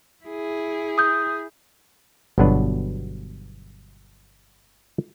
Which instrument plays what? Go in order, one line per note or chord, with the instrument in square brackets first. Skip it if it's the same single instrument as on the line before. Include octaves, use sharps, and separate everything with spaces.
[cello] E4 G#4
[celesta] D#6 G6
[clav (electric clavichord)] G1 B2 F#3 B3 D4 B4